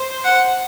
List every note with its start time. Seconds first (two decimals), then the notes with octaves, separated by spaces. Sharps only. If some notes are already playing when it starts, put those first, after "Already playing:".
Already playing: C5
0.25 F#5